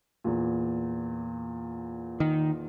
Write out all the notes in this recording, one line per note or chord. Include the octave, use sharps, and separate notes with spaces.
E2 A#2
D#3